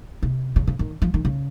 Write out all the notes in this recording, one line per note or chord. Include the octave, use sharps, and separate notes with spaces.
C3
C#3
C#3
D#3
F3
D#3
C#3